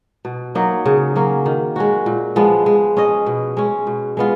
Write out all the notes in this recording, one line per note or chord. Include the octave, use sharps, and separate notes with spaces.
B2
F#3 A#3 D#4
C#3
F#3 A#3 C#4
D#3
G#3 C#4 F#4
A#2
F3 G#3 B3
G#3
C#4 G#4 D#5
B2
G#3 C#4
B2
G#3 B3 F4